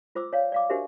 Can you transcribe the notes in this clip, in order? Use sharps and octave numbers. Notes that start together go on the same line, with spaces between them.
F4 C5 D6 E6
C#5 D5 F5
D5 F5 D6
D4 F#4 G4 A#4 C5 E5